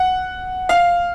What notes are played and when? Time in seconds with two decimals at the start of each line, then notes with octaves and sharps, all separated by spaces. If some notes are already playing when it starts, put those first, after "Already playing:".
Already playing: F#5
0.69 F5